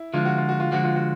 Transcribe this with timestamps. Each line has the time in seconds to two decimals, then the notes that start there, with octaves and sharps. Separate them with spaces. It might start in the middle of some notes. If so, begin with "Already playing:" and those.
Already playing: E4
0.14 D3 F3 G#3 F4
0.25 F#4
0.38 F4
0.49 F#4
0.60 F4
0.72 D3 F3 G#3 F#4
0.84 F4
0.96 F#4